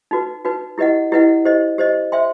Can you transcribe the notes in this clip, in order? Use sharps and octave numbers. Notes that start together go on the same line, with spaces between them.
D#4 F#4 B4
D#4 F#4 B4
E4 G4 B4 D#5 F#5
E4 G4 B4 D#5 F#5
G4 C5 D#5
G4 C5 D#5
C5 E5 G5 C6